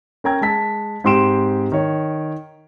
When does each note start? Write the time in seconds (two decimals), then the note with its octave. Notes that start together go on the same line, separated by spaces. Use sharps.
0.24 C#4 A#4 G5 A#5 G#6
0.41 G#3 A5 B6
1.04 G#2 C4 G4 C6 D7 E7
1.72 D#3 C#5